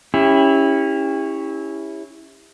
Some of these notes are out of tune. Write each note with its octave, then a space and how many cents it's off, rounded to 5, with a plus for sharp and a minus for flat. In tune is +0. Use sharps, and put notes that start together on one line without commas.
C#4 +0 E4 -10 G4 +30